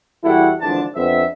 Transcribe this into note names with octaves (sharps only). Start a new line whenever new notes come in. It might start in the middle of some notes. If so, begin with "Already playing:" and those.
E2 G3 E4 F#4 A4 F#5
G#1 D3 E3 F3 D4 A5
F2 B3 C4 D4 E5